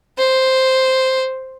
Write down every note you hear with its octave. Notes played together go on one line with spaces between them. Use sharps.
C5